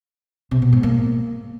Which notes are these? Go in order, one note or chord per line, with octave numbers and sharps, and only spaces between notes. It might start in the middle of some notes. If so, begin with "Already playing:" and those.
C3
B2
G#2
A#3